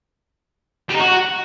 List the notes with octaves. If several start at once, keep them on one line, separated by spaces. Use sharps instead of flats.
G3
D#4
F#4